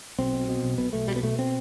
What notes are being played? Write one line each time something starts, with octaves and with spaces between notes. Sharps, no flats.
B1 C4
B2
B2
B1
B1 B3
B1 A3
B2 G3
B3
B2 A3
C4